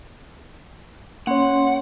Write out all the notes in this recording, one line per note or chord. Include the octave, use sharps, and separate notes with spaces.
A#3 C#4 C#5 F#5 C6